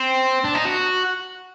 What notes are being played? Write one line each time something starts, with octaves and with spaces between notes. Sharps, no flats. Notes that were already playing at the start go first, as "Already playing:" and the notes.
Already playing: C4
D4
D#4
F#4